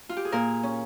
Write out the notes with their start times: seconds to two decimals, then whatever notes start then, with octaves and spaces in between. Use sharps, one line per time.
0.09 F4
0.17 G4
0.25 G#4
0.32 A#2 A#4
0.63 C#4